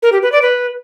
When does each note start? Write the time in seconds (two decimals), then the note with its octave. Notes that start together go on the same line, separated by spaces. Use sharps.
0.03 A#4
0.12 G4
0.22 B4
0.32 D5
0.42 B4